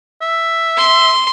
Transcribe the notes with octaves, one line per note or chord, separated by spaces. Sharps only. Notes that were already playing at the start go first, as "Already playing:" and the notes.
E5
C6